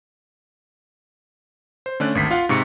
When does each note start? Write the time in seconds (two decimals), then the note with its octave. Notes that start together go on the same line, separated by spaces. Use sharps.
1.86 C5
2.00 D3 A3 C#4 D5 F#6
2.15 G#1 D2 B6 C7
2.31 F4 F5 F#5
2.49 G#2 C3 C#6 C#7